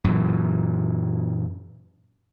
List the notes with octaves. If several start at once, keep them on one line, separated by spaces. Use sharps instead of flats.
F#2 A#2 E3